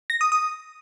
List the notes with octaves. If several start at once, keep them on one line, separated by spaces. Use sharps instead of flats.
A#6
D#6
D#6